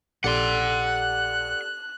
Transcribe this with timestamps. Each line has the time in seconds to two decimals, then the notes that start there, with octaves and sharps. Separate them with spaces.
0.24 A#1 G4 A4 D5 F#5 C6 F#6